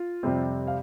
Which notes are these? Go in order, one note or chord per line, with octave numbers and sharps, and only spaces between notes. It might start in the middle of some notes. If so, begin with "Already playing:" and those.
Already playing: F4
F2 C3 G3 C4
F5